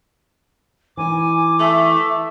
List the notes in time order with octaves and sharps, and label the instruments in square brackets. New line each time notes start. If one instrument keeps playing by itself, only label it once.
[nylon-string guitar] E3 D#4 [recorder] G#5 [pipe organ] D6
[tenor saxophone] A3 [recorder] E5